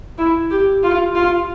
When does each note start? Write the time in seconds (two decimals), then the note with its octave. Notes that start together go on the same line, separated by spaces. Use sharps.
0.18 E4
0.50 G4
0.83 F4
1.15 F4